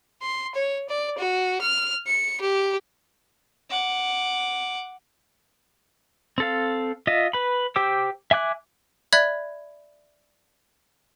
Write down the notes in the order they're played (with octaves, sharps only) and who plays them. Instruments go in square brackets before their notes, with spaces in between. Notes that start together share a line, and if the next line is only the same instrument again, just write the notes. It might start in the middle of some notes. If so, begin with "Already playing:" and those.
[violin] C6
C#5
D5
F#4
F6
C#7
G4
[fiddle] F#5 D6
[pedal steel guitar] C4 A4 F5
F4 D#5 E5
B4 B5
G4 C5 G5 D6 E6
E5 G#5 D6 F#6
[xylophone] D5 E5 B5 F#6 G#6